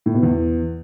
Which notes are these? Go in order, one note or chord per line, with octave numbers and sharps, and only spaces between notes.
A2
B2
E2